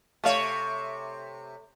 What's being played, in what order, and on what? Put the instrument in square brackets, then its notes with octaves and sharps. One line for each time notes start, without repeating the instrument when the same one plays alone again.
[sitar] C3 C#5 [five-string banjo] A3 F5